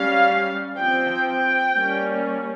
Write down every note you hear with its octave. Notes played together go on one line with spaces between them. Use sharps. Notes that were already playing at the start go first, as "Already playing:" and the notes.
Already playing: G3 C#4 F5
F3 C4 G5
G5
G3 A#3 C#4